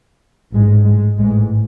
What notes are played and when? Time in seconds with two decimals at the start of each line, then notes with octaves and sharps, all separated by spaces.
0.53 A1 G#2 G#3
0.85 G#3
1.18 A1 G#2 G#3